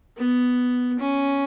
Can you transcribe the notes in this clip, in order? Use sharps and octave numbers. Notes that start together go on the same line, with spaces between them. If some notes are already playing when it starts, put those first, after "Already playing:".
B3
C#4